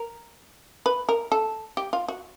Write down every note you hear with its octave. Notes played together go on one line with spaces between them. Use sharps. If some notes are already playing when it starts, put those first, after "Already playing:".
Already playing: A#4
B4
A#4
A4
G4
F4
F#4